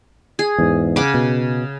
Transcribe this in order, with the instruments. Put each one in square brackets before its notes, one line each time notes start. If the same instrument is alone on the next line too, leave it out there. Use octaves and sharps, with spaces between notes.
[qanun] G#4
[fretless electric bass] E2 G#2
[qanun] C#3 F#5 D6
[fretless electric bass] B2